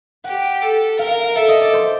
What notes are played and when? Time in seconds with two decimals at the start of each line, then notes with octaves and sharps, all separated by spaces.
0.24 G4 F#5
0.62 A4
0.99 A#4 F5
1.11 F5
1.23 F5
1.36 A4 E5
1.48 D#5
1.61 D5
1.73 C5